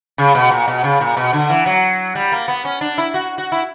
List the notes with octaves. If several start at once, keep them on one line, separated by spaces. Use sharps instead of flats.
C#3
B2
A#2
B2
C#3
A#2
B2
D3
E3
F#3
G3
A#3
B3
C#4
D4
E4
F#4
F#4
E4